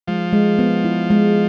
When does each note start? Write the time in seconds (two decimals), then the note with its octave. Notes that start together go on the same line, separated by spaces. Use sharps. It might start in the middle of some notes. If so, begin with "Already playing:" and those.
0.07 F3 G#3
0.33 G#3
0.59 B3
0.84 E4
1.10 G#3